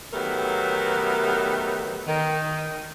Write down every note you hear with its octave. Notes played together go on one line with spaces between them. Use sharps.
D#3 F#3 A3 B3 G4 A#4
D#3